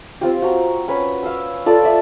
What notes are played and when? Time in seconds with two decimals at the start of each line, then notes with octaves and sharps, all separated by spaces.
0.21 C4 F4 G4
0.42 F#4 A#5
0.88 C#4 B4 B5
1.23 F5 E6
1.66 F4 A4 D5
1.83 D5 E5